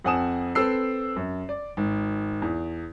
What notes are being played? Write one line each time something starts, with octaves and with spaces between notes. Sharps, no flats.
F2 C4 F#5 G#5 D#6 E7
C4 A4 B4 E6 C7
F#2
D5
G#1
E2